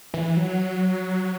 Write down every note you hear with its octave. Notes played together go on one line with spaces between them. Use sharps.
E3
F#3